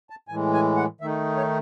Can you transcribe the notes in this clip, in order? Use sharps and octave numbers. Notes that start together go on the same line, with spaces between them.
A5
A2 E3 G#3 G#5
G#5
F#5
D#3 A3 D#4 E5
C#5